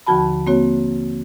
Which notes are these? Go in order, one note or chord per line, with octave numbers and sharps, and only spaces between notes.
D#2 D3 F3 F#4 A5 B5
A#3 C4 F#4 C#5